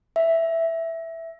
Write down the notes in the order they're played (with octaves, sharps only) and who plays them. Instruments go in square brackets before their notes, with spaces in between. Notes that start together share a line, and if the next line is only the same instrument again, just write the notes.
[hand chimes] E5